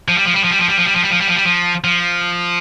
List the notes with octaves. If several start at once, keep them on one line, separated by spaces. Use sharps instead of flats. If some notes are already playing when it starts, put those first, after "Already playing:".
F3
G3
F3
G3
F3
G3
F3
G3
F3
G3
F3
G3
F3
G3
F3
G3
F3
F3